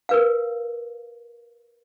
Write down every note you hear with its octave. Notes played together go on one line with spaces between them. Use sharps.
A#4 B4 F5